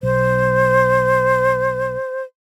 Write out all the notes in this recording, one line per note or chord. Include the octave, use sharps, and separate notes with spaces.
B1 C5